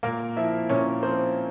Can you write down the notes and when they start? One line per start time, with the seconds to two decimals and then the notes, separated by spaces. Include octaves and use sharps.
0.03 A#2 A#3 A#4
0.37 F3 E4 E5
0.69 A#2 C#4 C#5
1.03 F3 C4 C5